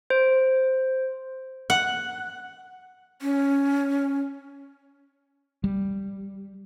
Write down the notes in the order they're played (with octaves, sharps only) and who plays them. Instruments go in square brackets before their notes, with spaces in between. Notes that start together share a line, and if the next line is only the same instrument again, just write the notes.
[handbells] C5
[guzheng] F#5
[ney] C#4
[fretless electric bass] G3